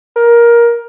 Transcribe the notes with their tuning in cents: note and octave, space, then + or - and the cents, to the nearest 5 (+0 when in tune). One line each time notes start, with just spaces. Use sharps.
A#4 +15